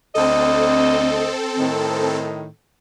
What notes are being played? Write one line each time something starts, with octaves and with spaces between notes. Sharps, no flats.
D2 C4 A4 D#5
A2 D#3